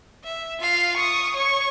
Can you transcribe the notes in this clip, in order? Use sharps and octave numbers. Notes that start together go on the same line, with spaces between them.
E5
F4 F5
C#6 D#6
C#5 C#6